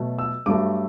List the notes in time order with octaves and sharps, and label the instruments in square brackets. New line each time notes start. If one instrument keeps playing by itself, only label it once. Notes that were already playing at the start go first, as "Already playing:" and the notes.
Already playing: [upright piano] B2 F#3 A3
E6
G2 F#3 A3 D6